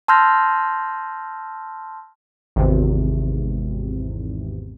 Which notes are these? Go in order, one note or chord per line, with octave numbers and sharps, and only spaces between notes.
A5 C6 E6 F6 G6 A#6
G#1 E2 C3